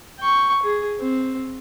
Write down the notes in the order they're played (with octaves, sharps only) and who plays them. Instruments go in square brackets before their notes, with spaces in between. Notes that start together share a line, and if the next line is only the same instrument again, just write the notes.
[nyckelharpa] G5 C#6
G#4
C4